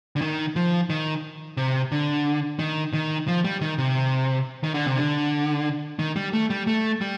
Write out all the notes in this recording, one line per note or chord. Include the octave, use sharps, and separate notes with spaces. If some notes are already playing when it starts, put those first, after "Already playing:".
D3
D#3
F3
D#3
C3
D3
D#3
D#3
F3
G3
D#3
C3
D#3
D3
C3
D3
D#3
G3
A3
G3
A3
G3